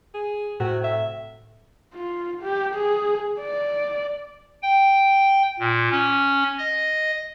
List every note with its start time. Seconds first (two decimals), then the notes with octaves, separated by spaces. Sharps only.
0.14 G#4
0.60 A2 C3 F#4
0.84 E5
1.94 F4
2.42 G4
2.75 G#4
3.40 D5
4.62 G5
5.60 A#2
5.91 C#4
6.58 D#5